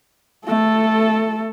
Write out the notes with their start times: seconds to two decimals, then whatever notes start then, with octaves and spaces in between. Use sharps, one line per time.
0.46 A3 A4